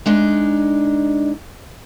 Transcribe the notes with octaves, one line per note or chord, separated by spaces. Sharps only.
G#3 D4 D#4